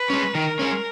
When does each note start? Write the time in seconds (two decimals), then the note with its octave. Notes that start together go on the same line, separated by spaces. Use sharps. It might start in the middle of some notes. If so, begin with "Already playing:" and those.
Already playing: B4
0.10 G#3 C#4
0.35 D#3 A#4
0.59 G#3 C#4